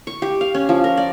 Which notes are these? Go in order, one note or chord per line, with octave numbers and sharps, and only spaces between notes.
C#6
G4
F5
C#4
F3
A#4
D5